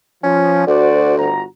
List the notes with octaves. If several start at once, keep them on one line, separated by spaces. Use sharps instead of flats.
F3 C#4
D2 F#4 C5 D5
G1 F#4 A#5